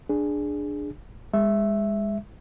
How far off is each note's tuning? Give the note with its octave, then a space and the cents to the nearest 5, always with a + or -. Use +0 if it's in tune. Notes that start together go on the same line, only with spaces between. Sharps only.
D4 +5 G#4 +0
G#3 -25 E5 +0